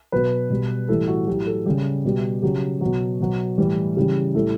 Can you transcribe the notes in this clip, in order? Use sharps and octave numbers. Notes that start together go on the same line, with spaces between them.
B2 F#3 B4
B2 G3
A2 E3 G3 A4
F#4
A2 F#3 G4
A4
C#3 G3 G4
B2 G3
C#3 F#3 G4
B2 F#3
B2 F#3
A2 E3 G3
C#3 E3 G3 G4
A2 G3 A4